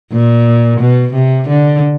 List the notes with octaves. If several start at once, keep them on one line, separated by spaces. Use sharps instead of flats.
A#2
B2
C3
D3